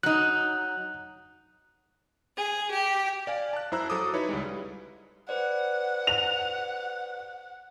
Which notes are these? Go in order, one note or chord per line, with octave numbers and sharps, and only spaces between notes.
F#3 D#4 F#6
G#4
G4
D5 F5 G#5
A5 F#6
F#2 E4 C5 A#5 E6 F#6
F#3 A4 A#5 D6 D#6
D#4 E4 B4 C#5
C#2 G3 G#3
B4 C5 D5 F#5
F7